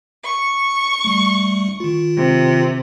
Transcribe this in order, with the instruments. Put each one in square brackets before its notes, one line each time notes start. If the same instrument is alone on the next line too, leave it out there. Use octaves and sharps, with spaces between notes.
[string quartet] C#6
[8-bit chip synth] G3 A3
D#3 F4
[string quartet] C3